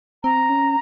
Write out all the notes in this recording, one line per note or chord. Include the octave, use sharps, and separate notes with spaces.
C4 A#5
C#4